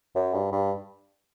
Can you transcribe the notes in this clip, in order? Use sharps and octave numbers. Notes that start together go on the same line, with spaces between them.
F#2
G2
G2